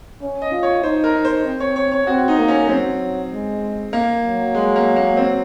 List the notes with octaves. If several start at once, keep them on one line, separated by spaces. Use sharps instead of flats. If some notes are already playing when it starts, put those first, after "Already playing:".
C#4
D#5
F4
C#5
D#4 C5
A#4
D#4
C5
C4
C#5
C#5
C#5
C4 F#4
D#4
A#3
C#4
F#3 C4
G#3
A#3
F#3
G#3
A#3
A#3
C4